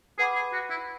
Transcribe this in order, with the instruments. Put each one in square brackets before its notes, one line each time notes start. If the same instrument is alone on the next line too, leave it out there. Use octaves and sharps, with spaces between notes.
[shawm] G#4 [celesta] B4 F#5 B5 D6
[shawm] G#4
F#4
E4